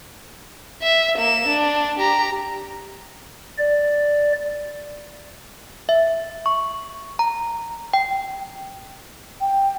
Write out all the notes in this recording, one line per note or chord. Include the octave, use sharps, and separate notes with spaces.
E5
A#3 E7
D4
G4 A#5
D5
E5
C#6
A#5
G5
G5